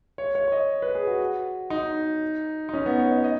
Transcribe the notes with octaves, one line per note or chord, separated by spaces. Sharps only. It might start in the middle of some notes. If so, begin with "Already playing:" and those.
C#5
C#5
C#5
D#5
B4
G#4
F#4
D#4
D#4
C#4
B3
C#5
D#5
D#5